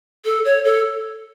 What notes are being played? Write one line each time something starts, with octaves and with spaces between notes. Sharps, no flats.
A4
C#5
A4